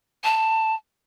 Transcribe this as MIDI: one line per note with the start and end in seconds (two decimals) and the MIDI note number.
0.24 0.75 81